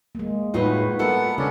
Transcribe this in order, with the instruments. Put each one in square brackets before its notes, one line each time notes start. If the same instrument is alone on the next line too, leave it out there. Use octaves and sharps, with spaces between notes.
[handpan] G#3 A#3
[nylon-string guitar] A2 D#4 G#4 [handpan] F4 F#4 B4
[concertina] B3 F#5 [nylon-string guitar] A4 E5 [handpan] A#4
[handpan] C#3 [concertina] C#4 D4 [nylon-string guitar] A4